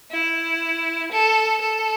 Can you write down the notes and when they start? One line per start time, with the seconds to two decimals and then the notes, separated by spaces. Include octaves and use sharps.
0.11 E4
1.12 A4
1.61 A4